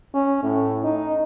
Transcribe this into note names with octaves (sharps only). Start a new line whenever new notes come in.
C#4
A2
D#4